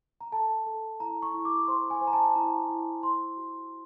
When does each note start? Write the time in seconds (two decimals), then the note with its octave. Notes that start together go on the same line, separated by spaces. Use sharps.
0.21 A#5
0.32 A4 A5
0.66 A4
1.00 E4 A#5
1.22 C#6
1.34 E4
1.45 D6
1.68 C5 C6
1.90 G#5
2.01 C5
2.07 A#5
2.13 A5
2.35 E4 A#5
2.69 E4
3.03 C5 C6
3.37 F#4